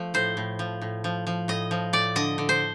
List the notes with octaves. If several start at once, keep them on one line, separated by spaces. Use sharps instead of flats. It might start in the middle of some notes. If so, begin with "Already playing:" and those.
Already playing: F3 A3
A2 C5
A2
F3
A2
F3
F3
A2 D#5
F3
A2 D5
D3 D#5
D3
C5